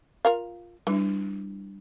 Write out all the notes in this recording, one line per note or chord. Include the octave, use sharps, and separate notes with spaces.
F4 A#4 F5
E3 G3 D4